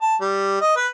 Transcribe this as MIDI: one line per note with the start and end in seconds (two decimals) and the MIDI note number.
0.01 0.15 81
0.21 0.59 55
0.61 0.72 75
0.77 0.87 71